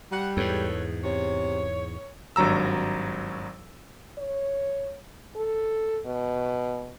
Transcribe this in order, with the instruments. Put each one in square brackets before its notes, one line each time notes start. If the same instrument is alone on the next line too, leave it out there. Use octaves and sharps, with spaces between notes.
[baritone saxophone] G3 [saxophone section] F#5
[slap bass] E2 G#2 [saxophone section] A4 B4 C#5
[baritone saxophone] C3 [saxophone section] C#5
[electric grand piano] G#1 G2 F#3 A#5 E6
[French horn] C#5
A4
B2